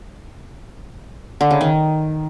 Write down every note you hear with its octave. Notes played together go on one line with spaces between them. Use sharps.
D3
C#3
D#3